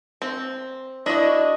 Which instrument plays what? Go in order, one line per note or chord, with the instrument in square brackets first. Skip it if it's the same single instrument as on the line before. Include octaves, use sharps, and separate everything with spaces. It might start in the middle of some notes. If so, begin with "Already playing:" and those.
[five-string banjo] C4
[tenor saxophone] D4 [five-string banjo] E4 F#4 [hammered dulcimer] D#5